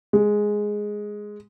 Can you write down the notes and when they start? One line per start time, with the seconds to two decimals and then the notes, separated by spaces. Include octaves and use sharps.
0.13 G#3